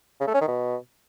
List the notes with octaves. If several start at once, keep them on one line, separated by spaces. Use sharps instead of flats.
C#3
A3
C#4
D#3
B2